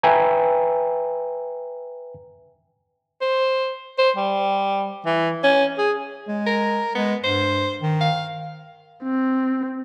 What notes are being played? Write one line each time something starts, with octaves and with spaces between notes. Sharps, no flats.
B4 E5 G5 G#5 A#5
C5
C5
G3
E3
C#4
G#4
G#3
A#4
G#3 B3
G2 C5
D#3
F5
C4